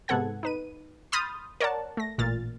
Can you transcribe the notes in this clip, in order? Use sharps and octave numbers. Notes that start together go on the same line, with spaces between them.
G#2 C3 B3 A4 F#5 G#6
D#4 B4 D#7
B5 C6 D#6 F6 G6 A6
A#4 C#5 D5 F#5 A5
A3 A#6
A1 A#2 F6 A6